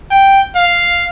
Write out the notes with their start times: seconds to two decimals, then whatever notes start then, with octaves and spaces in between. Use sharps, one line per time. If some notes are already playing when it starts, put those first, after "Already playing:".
0.11 G5
0.55 F5